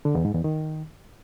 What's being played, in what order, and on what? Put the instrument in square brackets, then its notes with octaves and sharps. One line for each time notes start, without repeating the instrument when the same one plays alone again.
[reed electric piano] D3
E2
G#2
E2
D#3